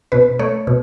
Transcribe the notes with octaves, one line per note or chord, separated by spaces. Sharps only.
B2 B4
A3 C#5
B2